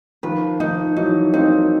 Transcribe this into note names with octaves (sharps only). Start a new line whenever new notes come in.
D#3 F3 B4
D#3 F3 D#4
E3 F#3 D#4
A#3 C4 D#4